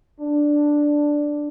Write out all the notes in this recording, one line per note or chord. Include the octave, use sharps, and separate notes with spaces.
D4